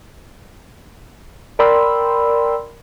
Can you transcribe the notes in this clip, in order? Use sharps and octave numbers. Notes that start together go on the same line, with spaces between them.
A#4 D5 G5 B5 C6 E6